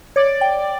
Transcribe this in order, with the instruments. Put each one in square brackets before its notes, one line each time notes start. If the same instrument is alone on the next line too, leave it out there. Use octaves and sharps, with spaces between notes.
[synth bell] C#5 [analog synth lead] D5
[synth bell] G5